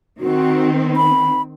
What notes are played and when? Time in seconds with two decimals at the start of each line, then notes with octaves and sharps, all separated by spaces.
0.20 D#3 C4 F#4
0.96 B5